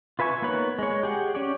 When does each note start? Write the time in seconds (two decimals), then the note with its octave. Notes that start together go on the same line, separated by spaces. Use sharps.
0.19 F4 B4 E5 G#5 C#6
0.42 A#3 B3 D#4 B4 C#5
0.79 G#3 C#5
1.03 G4 G#4 F#5
1.35 C#4 G4 C#5 D5